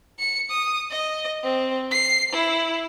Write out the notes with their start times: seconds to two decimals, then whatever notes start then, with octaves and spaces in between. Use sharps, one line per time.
0.19 C#7
0.51 D#6
0.91 D#5
1.43 C4
1.91 C7
2.32 E4